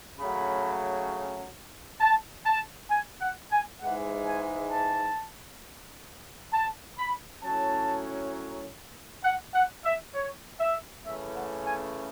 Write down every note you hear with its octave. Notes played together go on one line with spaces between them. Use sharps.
C#3 F#3 A3 C#4 B5
A5
A5
G#5
F#5
G#5
G#2 E3 G#3 F#5
G#5
A5
A5
B5
A2 F#3 C#4 A5
F#5
F#5
E5
C#5
E5
C#3 E3 A3 C#4 E5
F#5
G#5